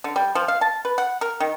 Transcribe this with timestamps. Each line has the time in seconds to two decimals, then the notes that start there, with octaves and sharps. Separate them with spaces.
0.04 D3
0.16 G3
0.35 F3
0.48 F5
0.61 A5
0.85 B4
0.98 F#5
1.21 A#4
1.40 D#3